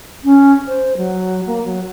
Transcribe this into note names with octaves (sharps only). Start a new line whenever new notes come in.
C#4
C5
F#3
A#3
F#3